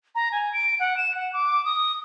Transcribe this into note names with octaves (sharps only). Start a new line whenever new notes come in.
A#5
G#5
D7
F#5
E7
F#5
D6
D#6